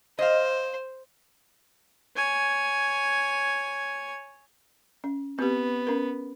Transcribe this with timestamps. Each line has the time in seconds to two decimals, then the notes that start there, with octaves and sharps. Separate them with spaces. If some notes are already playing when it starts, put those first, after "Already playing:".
0.19 C5 D#5 F5
2.16 C#5 G#5
5.04 C#4
5.39 B3 C4 G4
5.87 C#4 A#4